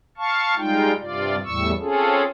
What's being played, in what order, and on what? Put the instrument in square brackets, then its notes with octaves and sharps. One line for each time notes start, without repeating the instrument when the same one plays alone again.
[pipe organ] F5 A5 C#6
G3 G#3 D#4 F4 G5
G2 C3 F4 D5
E2 A2 G3 C#6 E6
C4 C#4 F4 G#4 A4